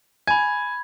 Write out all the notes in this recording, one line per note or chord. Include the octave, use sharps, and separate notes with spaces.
G#5 B5 G#6